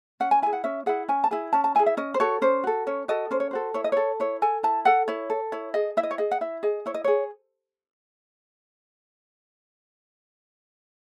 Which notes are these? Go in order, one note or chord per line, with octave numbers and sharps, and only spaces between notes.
C#4 F#5
G#5
E4 G#4 G#5
F#5
C#4 E5
E4 G#4 F#5
C#4 G#5
A5
E4 G#4 G#5
C#4 A5
A5
E4 G#4 G#5
E5
C#4 D#5
C5
F#4 A4 C#5
C#4 C5
F#4 A4
C#4 C#5
F#4 A4 D#5
C#4 C5
C#5
F#4 A4 C5
E4 C#5
D#5
A4 C#5
E4 C#5
A4 G#5
E4 A5
A4 F#5
E4 C#5
A4
E4 C#5
G#4 D#5
E4 E5
D#5
C#5
G#4 D#5
F#5
E4 E5
G#4 D#5
E4 C#5
D#5
G#4 C#5